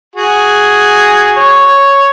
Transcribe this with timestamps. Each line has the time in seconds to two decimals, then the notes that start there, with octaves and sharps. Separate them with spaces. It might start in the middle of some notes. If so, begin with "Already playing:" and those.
0.15 F#4 G#4
1.37 C#5